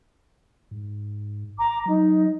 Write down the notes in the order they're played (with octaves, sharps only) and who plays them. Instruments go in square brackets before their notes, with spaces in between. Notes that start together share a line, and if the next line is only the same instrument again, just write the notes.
[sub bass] G#2
[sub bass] A1 [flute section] A#5 D6
[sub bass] F#3 [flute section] D#4